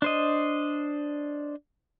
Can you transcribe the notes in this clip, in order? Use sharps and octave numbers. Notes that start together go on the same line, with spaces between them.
D4 C5 D#5